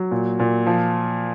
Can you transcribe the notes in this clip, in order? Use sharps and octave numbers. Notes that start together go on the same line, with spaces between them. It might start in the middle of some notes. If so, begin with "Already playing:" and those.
Already playing: F#3
A#2
A#2
F3